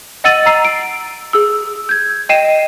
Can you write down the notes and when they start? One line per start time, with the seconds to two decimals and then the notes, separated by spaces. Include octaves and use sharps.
0.24 D#5 F#5 E6 A6 D#7 F#7
0.46 A#5 E6 C7
0.65 D7
1.33 G#4 E6
1.89 G6 G#6
2.29 D#5 G5 C7 D#7 E7